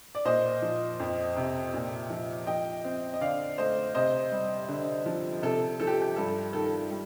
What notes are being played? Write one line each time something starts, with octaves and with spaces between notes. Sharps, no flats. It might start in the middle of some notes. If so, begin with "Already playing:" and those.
D5
A#2 C5 D#5
F3
F2
C3
A#2
F3
F3 D#5 G5
C4
D#5
D3 D5 F5
A3 C5 D#5
C3 C5 D#5
G3
D3
F3
C3 A4
F3 A4
G4
G4
G2 A4
D#3 A4
G3